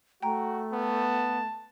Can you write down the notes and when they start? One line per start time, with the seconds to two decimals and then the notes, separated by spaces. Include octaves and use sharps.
0.23 A3 F#4 G5 A#5
0.73 B3 A5